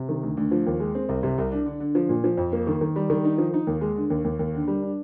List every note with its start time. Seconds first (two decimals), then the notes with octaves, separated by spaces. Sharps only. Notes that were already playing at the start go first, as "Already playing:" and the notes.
Already playing: C3
0.09 D#3
0.23 D2
0.37 D2
0.51 F3
0.66 D#2
0.80 G#3
0.95 C4
1.09 C2
1.23 C3
1.38 C2
1.52 D4
1.66 D3
1.80 D3
1.95 F3
2.09 A#2
2.24 F3
2.37 F2
2.52 A#3
2.67 D#3
2.81 D#3
2.96 G3
3.10 D#3
3.24 D#4
3.38 F3
3.54 D#4
3.67 D#2
3.81 G#3
3.96 D3
4.10 D#2
4.24 D#2
4.39 D#2
4.54 D3
4.67 G3
4.82 D4